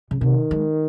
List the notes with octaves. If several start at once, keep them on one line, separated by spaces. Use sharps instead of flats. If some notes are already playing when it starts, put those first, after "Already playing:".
C#3
C3 D#3
G#3